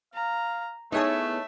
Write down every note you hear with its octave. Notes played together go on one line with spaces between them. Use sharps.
F5 A#5
A3 B3 D#4 E4 G#4 C#5 E5 A5